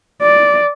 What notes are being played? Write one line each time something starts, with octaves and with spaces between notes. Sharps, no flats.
D5